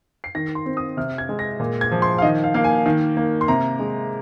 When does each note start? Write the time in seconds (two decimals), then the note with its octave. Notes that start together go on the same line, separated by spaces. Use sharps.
0.24 C7
0.35 D#3 A#6
0.55 C6
0.66 C4
0.77 D#6
0.97 C3 F6
1.18 G#6
1.29 G#3
1.39 A#6
1.60 A#2
1.81 G#6
1.92 F3
2.02 C6
2.18 F5
2.22 D#3 D#5
2.44 F5
2.54 A#3 F5
2.64 G#5
2.86 D#3
3.17 A#3
3.41 C6
3.48 C3 A#5
3.79 G#3